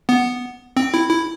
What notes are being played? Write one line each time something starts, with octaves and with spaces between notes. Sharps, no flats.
B3
C4
E4
E4